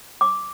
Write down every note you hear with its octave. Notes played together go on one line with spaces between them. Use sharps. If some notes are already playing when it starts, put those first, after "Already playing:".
D6